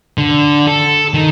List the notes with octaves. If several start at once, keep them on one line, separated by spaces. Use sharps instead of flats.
D3
A4
D#3